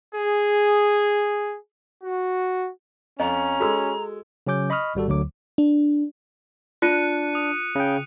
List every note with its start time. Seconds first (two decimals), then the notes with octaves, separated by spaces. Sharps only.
0.15 G#4
2.03 F#4
3.20 F2 C#4 D#5 A#5
3.60 G#3 F#4 A4 E6
4.47 C#3 F#3 C#4 D6 G6
4.70 D#5 B5 C#6 D#6 F6
4.95 G#1 G3 F#4 A4
5.08 D2 D3 F#3 D6
5.58 D4
6.82 D4 F4 F#6 C#7 D#7
7.35 D#6
7.75 C#3 G5